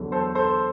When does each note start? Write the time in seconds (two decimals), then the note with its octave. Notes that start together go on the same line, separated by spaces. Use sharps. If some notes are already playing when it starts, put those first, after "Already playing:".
Already playing: E2 D3 F#3
0.12 A4 C5
0.35 A4 C5